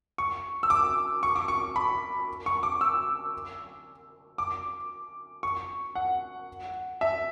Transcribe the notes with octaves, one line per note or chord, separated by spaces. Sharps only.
C#6
E6
D6
C#6
D6
C#6
B5
C#6
D6
E6
D6
C#6
F#5
E5